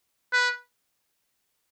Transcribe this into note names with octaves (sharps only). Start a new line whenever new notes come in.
B4